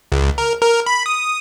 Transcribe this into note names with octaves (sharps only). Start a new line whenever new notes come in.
C#2
A#4
A#4
B5
D#6